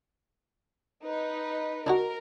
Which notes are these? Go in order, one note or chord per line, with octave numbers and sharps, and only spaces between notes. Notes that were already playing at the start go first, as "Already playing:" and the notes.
D#4 B4
D4 D#4 F#4 A#4